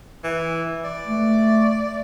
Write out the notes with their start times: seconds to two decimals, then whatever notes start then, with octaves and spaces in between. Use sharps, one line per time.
0.24 E3
0.85 D5
1.07 A3